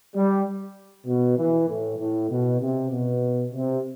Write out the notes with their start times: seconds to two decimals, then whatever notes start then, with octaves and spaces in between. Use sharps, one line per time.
0.15 G3
1.06 B2
1.38 E3
1.68 A2
1.99 A2
2.30 B2
2.60 C3
2.90 B2
3.52 C3